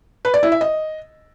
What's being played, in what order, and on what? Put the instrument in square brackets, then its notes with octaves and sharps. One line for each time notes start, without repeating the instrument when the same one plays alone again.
[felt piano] B4
D5
E4
E5
D#5